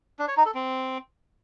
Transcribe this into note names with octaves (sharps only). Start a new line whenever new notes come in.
D4
C#5
D#4
A4
C4